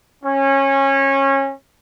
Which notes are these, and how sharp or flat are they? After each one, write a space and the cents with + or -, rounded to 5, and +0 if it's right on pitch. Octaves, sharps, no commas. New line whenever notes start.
C#4 -20